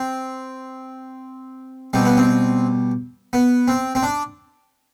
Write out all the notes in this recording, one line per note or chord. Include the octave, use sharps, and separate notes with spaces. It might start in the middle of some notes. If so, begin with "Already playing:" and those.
Already playing: C4
B2 G3 C4
B3
C4
B3
C4
C4
D4